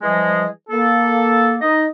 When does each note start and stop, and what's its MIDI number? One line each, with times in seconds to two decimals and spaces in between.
0.02 0.46 52
0.02 0.46 53
0.02 0.46 55
0.02 0.46 56
0.02 0.46 68
0.02 0.46 75
0.69 1.54 58
0.69 1.54 69
1.61 1.85 63
1.61 1.85 75